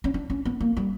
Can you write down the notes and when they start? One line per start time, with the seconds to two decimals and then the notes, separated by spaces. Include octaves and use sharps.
0.04 C#4
0.14 D4
0.30 C#4
0.45 B3
0.61 A#3
0.77 G3